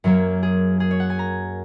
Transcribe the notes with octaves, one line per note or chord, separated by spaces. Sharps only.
F#2 F#3 A#3 C#5
G#4
G#4
C#5
F#5
G#5
A#5